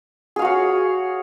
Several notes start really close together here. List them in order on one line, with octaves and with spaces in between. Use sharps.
G#4 F5 F#4 C#5